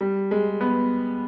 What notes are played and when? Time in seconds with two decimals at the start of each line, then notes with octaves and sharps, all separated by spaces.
0.01 G3
0.31 G#3
0.61 B3